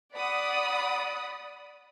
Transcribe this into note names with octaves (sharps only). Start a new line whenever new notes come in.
D5 F#5 B5 D#6